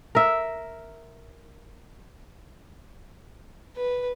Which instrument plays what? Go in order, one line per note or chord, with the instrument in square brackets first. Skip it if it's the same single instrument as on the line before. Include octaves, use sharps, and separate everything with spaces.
[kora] A#4 E5
[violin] B4